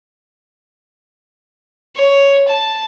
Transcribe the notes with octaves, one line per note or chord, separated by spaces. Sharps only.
C#5
A5